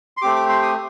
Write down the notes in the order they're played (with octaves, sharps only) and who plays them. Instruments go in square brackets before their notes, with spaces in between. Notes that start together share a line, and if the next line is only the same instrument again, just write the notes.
[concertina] C6
A3 C4 G4 D6
D6
C6
D#6